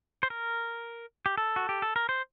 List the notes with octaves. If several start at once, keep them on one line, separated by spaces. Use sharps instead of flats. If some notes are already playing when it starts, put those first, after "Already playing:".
C5
A#4
G4
A4
F#4
G4
A4
A#4
C5